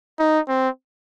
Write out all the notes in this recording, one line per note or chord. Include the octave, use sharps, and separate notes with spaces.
D#4
C4